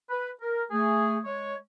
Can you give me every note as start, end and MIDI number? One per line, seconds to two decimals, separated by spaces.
0.10 0.29 71
0.41 0.64 70
0.71 1.18 57
0.71 1.18 68
1.25 1.55 56
1.25 1.55 73